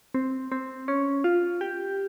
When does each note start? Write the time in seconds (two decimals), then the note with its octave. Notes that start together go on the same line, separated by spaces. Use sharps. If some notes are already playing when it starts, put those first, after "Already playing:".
0.14 C4
0.52 C4
0.88 C#4
1.24 F4
1.61 G4